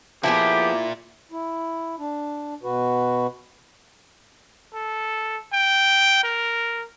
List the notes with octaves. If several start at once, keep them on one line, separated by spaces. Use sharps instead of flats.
A#2 F3 B3 E4 G4 G#4
E4
D4
B2 F#4 B4
A4
G5
A#4